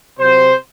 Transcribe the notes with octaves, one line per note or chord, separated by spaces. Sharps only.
C3 F#3 C4 C5